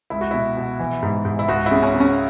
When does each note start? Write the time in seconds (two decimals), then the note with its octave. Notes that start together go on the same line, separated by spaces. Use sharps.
0.10 C#2 E4
0.21 F#4
0.31 B2 E4
0.57 B2
0.79 E3
1.02 G#2
1.25 G#2
1.39 E4
1.48 C#2 F#4
1.66 E4
1.71 C#3
1.83 C#4
1.95 C#3
2.00 C#4